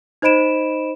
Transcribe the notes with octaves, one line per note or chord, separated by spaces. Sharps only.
D#4 C5 D#5 B5 D7 E7